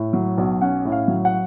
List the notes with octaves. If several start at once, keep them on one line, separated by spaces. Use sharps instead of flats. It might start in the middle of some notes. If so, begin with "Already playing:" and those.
Already playing: A2
F#3
B1
C#4 F#5
A2
F5
F#3
F#5